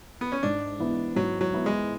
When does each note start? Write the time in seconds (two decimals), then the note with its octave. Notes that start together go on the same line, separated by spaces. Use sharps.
0.21 B3
0.32 C#4
0.43 G#2 D4
0.79 E3 B3 E4
1.16 G#2 F#3
1.41 F#3
1.53 E3 B3 E4
1.66 G#3